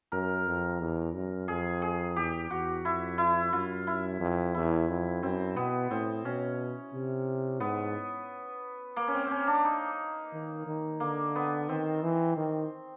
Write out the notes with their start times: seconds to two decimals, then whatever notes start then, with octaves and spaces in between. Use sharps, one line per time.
0.12 F#2 A#4
0.46 F2
0.80 E2
1.15 F#2
1.48 F2 G#4
1.82 G#4
2.16 E2 G4
2.50 E2 F#4
2.84 F2 E4
3.18 E4
3.52 F#2 F4
3.87 E4
4.20 F2
4.54 E2 E4
4.88 F2
5.22 F#2 C4
5.56 B2 B3
5.90 A2 C4
6.24 B2 C#4
6.93 C3
7.60 G#2 B3
8.96 A#3
9.08 C#4
9.14 C4
9.25 C4
9.31 C#4
9.47 D4
9.65 D#4
10.33 D#3
10.67 D#3
11.00 D3 A#3
11.35 B3
11.69 D#3 C4
12.03 E3
12.37 D#3